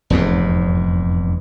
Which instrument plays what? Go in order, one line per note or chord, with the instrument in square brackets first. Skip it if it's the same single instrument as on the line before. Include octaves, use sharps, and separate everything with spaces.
[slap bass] F1 E2 G#2